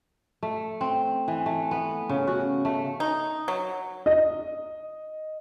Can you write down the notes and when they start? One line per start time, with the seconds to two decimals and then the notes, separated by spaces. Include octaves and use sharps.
0.43 A3
0.81 C4
1.28 E3
1.46 A3
1.71 B3
2.09 C#3
2.27 F#4
2.65 A3
3.00 D#4
3.48 F#3
4.06 D#5